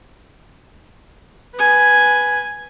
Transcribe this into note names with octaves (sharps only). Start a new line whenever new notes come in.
B4 G#5